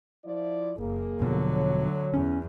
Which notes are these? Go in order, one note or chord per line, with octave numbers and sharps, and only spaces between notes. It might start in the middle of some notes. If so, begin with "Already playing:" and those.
F3 E4 D5
F#1 A#3 G#4
E1 B2 D3 F3 F#3
D2 C#5
E2 C#4